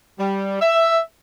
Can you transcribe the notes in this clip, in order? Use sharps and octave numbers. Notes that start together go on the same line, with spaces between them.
G3
E5